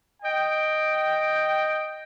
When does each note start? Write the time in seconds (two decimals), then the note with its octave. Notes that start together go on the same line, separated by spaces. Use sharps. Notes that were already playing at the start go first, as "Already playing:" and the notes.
0.21 D#5 G5